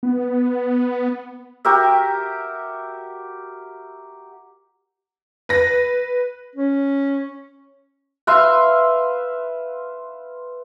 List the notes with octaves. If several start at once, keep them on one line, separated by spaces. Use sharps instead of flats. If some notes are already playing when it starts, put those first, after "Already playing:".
B3
F#4 G4 A#4 E5
B4 A#6
C#4
B4 E5 F5 C6